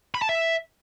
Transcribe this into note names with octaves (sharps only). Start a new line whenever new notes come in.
B5
A5
E5